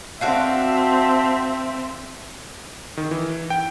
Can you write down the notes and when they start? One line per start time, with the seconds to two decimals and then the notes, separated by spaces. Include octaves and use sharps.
0.21 C4 D4 F#4 E5 F5
2.97 D#3
3.11 E3
3.50 G5